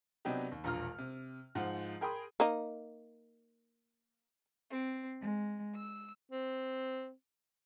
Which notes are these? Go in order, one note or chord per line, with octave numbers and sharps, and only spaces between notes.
C3 F#3 B3 D4 D#4 G4
D#2
E1 A#1 F4 A#5 F6
C3
G#2 F3 F4 F#5
G#4 A#4 G5 B5 C6 D#6
A#3 D#4
C4
G#3
E6
C4